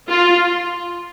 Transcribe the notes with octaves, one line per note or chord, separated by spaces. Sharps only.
F4